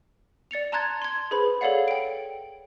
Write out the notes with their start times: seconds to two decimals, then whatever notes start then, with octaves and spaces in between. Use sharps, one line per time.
0.51 D5 A6 C#7 F7
0.72 A5 A#5 C6 F#6 G#6 A6
1.02 C6 G#6
1.31 G#4 B4 C5 B5
1.61 G#4 A4 C#5 D5 F5 F#5
1.88 G5 D7